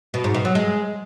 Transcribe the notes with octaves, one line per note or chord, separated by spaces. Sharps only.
B2
G#2
B2
F#3
G#3